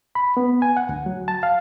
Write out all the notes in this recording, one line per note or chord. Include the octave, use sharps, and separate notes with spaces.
B5
B3
G#5
F#5
D2
F#3
A5
F5